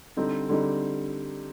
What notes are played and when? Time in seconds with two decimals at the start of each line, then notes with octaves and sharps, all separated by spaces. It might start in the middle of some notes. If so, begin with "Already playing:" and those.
0.17 D3 G3 C4 D#4
0.49 D3 G3 C4 D#4